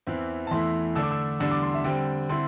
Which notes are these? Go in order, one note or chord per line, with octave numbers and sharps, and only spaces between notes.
E2 E3 C4 E4
A5
E2 E3 A3 E4 C6
D3 A3 D4 E6
D6
E6
E2 D3 G3 D4 E6
D6
C6
E5
D3 G3 C4 G5
D3 C4 E4 C6